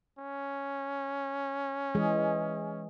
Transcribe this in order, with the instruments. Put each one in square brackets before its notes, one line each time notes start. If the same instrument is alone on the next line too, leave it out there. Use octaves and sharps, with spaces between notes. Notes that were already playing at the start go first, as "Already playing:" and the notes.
[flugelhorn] C#4
[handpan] E3 G#3 G#4